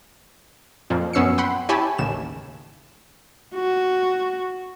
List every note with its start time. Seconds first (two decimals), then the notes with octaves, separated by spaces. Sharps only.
0.90 F2 A#2 F3
1.13 F#2 B3 C#4 E6 C7 C#7
1.38 F#5 G5 B5 C6
1.69 E4 G4 C#5 G#5 A5 B5
1.98 A1 D#2 C#3 E7
3.55 F#4